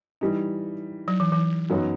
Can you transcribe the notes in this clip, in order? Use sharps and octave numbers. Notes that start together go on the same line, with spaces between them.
E3 G3 D#4
F#3
E3
E3
F#2 F#3 B3 D#4 F#4